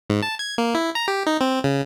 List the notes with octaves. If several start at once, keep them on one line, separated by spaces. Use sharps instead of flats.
G#2
A5
G#6
A#3
E4
A#5
G4
D#4
C4
C#3